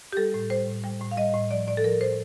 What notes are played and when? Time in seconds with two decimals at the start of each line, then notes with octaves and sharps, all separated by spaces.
0.12 G4
0.17 G3 A4
0.34 A2
0.50 G3 C5
0.67 A2
0.84 G3 G5
1.01 A2
1.11 F5
1.17 G3 D#5
1.34 A2
1.51 F3 D5
1.67 A2 D5
1.77 A4
1.84 F3 A#4
2.01 A2 C5